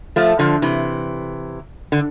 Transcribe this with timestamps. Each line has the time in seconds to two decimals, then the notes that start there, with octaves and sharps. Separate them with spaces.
0.16 F3 A3
0.39 D3 F3
0.62 C3 E3
1.92 D3